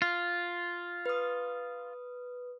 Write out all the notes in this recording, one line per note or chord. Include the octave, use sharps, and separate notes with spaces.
F4
B4 D#6